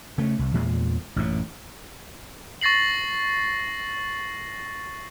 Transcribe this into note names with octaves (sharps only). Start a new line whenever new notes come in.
C#3 A3
C2
E2 A#2 G#3
A1 F#2 A#2
C#6 A6 A#6 C7 F#7